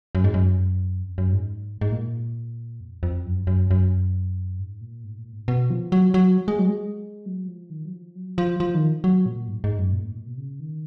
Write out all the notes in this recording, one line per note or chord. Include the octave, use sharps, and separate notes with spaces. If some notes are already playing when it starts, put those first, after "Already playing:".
F#2
G#2
F#2
F2
F#2
G#2
G#2
A#2
F2
F2
F#2
F#2
F#2
G#2
A#2
G#2
A#2
G#2
B2
F3
F#3
F#3
G#3
F#3
G#3
F#3
F3
D#3
F#3
F3
F#3
F3
F3
D#3
F#3
A#2
G#2
G#2
F#2
A#2
G#2
A#2
B2
C#3
D#3